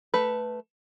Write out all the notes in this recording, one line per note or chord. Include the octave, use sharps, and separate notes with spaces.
A3 B4